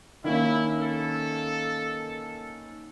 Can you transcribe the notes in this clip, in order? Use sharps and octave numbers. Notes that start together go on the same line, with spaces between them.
D#3 A#3 C#4 E4
A4